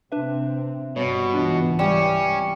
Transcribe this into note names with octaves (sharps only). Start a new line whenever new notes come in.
C3 C4 D4 B4 E5
G1 B2 G3 C#5
C#2 G#2 E3 D4 F4 D#5
G3 C#4 E7